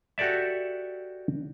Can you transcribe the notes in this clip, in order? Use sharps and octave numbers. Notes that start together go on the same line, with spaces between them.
F#4 G4 A4 D5 E5